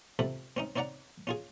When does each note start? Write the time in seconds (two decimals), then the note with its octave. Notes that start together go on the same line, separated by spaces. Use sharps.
0.19 C3 F3 A4 B5
0.57 C4 C#4 D#4
0.76 C4 D#4 C#5 D5 F#5 A#5
1.27 C#4 F4 G#4